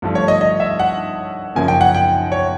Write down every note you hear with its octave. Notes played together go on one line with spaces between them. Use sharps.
G2 D3 F3 A3
C#5
D#5
D#5
E5
F#5
F#2 C#3 F3 A#3 G#5
G5
F#5
G5
C#5